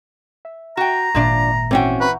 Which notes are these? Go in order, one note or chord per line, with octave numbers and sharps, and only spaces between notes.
E5
F#4 G5 A#5
G#1 A#2 F3 D4 D5 E5
E3 C4 C#4 F#4 G5
B4 F#5 A#5 C#6